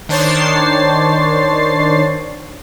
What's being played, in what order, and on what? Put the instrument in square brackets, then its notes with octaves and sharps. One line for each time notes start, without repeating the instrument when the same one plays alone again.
[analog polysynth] D#3 D4 C5 C#5 A6 C7